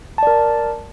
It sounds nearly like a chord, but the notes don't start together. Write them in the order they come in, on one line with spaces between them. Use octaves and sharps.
A5 D5 A#4